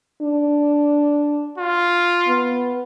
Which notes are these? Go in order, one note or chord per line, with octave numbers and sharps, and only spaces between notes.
D4
F4
B3